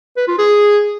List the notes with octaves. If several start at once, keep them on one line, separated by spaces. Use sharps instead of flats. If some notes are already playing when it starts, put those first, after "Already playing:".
B4
F4
G#4